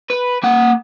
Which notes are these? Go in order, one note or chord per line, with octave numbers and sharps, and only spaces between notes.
B4
A#3 F#5